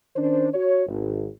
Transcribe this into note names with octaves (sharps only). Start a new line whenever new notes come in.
D#3 C#4 D4 C5
F#4 C#5
G#1